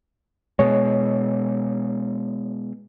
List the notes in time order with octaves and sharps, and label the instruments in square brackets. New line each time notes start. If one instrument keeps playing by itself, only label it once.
[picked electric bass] B2 G#3 [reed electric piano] C#5